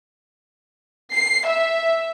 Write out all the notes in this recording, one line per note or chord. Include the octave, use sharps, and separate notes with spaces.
C7
E5